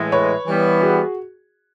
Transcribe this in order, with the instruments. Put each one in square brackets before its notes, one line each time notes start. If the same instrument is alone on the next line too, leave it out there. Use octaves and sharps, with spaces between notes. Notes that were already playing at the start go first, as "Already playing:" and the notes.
Already playing: [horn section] A2 E3 G#3
[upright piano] B4 C#5
[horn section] E3 G3 B3
[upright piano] F#4 G#4